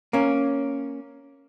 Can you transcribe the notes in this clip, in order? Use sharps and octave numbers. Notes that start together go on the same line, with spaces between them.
A#3 C#4